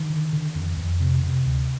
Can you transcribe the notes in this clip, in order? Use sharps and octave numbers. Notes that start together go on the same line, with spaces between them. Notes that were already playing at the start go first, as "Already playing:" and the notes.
Already playing: D#3
D3
D3
F2
F2
C3
C3
D2